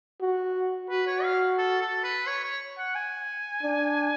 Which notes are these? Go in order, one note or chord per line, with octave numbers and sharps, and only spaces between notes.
F#4
F#4 B4
C#5
F5
A4
A4
B4
C#5
C#5
F#5
G#5
D4